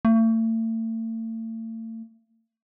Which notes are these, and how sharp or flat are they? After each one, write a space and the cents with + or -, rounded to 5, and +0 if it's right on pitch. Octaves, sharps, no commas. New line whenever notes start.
A3 +40